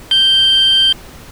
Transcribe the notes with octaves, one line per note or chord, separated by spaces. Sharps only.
G6